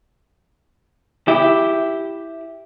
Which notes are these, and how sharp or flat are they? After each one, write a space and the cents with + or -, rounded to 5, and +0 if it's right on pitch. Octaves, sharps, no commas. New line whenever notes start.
E4 +0 G4 +0